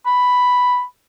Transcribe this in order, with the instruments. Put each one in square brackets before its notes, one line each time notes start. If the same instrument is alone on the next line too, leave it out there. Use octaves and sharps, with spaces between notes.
[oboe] B5